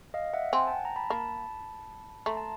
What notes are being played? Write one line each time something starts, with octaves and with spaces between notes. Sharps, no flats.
D#5 F5
E5 F#5
C4 F#5 G#5
G5 A5
A#5
A5 B5
A#3 A5 B5
A3 A#5 C6
A5